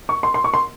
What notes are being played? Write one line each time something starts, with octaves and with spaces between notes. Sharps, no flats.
C#6
C6
C6
C#6
C6